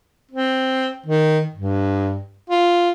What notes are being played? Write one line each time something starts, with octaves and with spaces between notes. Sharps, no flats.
C4
D#3
G2
F4